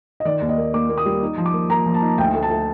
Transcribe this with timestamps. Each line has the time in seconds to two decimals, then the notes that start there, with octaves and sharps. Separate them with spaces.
0.20 D#5
0.25 D#3 D5
0.41 D#2
0.49 D#5
0.58 A#3
0.74 A#3 D6
0.89 A#3
0.98 D#6
1.06 G3
1.22 D#4
1.38 F3
1.46 D6
1.54 A#3
1.70 A#3 A#5
1.86 F3
1.94 A5
2.02 D#4
2.18 D2 G5
2.35 A3
2.43 A5
2.50 A3